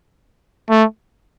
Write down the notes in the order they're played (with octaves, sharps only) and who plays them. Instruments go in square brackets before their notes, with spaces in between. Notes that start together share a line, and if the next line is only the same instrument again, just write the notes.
[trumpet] A3